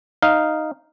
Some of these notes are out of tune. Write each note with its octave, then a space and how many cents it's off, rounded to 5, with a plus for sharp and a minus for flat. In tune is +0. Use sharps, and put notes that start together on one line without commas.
D#4 +0 F5 +0